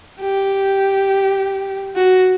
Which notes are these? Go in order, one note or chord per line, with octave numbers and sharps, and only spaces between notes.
G4
F#4